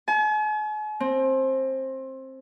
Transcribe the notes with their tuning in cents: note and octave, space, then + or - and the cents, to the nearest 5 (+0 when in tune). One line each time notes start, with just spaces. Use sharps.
G#5 +45
C4 +20